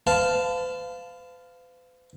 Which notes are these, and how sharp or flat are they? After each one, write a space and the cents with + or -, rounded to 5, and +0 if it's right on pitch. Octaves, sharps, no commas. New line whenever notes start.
B4 +45 F5 +0 A5 +0